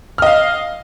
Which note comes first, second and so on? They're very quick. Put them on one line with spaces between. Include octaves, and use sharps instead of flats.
F6 D#5 F5